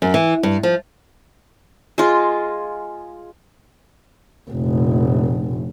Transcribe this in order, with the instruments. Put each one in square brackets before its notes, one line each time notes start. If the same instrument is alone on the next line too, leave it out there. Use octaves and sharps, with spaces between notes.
[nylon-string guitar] F#2
E3
G2
F3
[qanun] G#3 F4
[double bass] F1 A#1